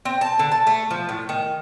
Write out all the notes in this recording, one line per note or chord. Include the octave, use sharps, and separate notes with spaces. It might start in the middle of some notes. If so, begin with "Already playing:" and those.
C4
A5
D3
A5
A3
F3
A2
D#3